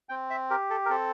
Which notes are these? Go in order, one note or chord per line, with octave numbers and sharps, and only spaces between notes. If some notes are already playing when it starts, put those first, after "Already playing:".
C4 G5
E5
G4 A#4
A4
A#4
C4 A4